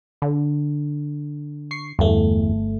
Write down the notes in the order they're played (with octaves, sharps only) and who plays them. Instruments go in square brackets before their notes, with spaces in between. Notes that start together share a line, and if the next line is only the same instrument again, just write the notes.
[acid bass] D3
[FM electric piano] C#6 C7
[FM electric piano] G1 A3 [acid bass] E2